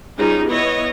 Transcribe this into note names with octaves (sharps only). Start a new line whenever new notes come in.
G3 C#4 D#4 F4 G#4
B3 E4 C#5 D#5